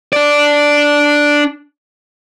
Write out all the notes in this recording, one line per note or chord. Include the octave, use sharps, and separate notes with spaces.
D4 D5